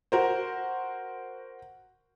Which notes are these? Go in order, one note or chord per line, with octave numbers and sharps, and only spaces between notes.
F#4 A#4 C5